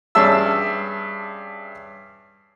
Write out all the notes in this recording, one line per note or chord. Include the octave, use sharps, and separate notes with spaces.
G2 C#4 G#4 E5 A5 E6